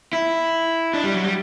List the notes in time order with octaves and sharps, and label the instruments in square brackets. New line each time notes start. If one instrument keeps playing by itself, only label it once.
[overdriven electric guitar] E4
D4
G3
F#3
G3